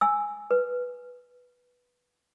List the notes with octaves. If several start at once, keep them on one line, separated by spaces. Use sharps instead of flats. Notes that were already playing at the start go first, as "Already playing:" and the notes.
G#5 E6
B4